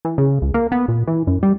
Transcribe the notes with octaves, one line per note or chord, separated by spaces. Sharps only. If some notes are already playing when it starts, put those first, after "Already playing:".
E3
C#3
C#2
A#3
B3
A#2
E3
F#2
G3